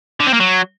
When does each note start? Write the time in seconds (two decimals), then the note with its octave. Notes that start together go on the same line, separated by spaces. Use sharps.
0.20 D3
0.27 C4
0.33 A#3
0.40 F#3